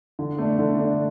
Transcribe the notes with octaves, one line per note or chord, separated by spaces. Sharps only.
D3
A3 D4
D3
A3 D4